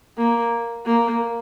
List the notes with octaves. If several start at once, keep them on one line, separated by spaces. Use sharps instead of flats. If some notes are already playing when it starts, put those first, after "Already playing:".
A#3
A#3